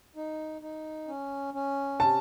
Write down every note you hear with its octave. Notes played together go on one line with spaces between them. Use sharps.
D#4
D#4
C#4
C#4
C3 A5